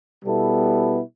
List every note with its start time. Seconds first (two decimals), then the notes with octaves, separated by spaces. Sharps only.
0.22 B2 G3 B3 E4 A4